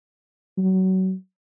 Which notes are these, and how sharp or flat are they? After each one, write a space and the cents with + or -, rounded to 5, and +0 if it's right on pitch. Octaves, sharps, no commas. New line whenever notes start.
F#3 +25